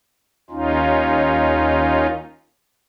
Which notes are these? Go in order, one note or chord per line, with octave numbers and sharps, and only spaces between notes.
D#2 C#4 D#4 F4